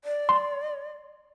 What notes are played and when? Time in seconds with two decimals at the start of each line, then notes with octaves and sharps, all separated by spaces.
0.04 D5
0.29 C6